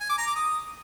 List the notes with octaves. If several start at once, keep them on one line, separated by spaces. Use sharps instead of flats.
G#5
D6
A#5
D6
D#6